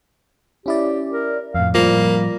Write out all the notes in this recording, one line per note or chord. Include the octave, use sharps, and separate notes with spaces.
C#4 E4 G4 D5
A#4
F2 A2 F5
A2 F3 G3 A#3